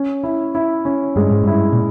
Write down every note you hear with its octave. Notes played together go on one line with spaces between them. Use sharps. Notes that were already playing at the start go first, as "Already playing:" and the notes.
Already playing: C#4
E4
E4
C#4
G2 G#3
G#2
G2 E4
A#2